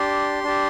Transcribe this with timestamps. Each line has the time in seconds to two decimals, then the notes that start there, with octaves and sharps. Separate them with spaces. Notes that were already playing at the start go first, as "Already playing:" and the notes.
Already playing: D4 G4 C6
0.43 D4 G4